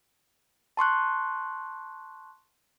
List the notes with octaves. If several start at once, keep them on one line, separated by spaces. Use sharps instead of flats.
A5 C6 C#6 F#6